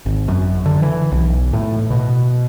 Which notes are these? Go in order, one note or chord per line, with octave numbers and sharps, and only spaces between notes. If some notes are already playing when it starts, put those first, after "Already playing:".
G#1
F#2
D3
E3
B1
A2
B2